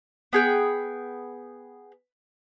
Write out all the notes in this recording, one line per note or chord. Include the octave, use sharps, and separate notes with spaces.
B3 G#4 G5